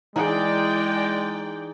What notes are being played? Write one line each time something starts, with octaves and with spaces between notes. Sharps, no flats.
E3 G#3 D#4 G#4 D5 G5